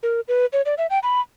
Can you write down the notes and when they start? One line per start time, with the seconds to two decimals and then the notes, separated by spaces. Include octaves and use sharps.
0.03 A#4
0.28 B4
0.53 C#5
0.66 D5
0.78 E5
0.90 G5
1.03 B5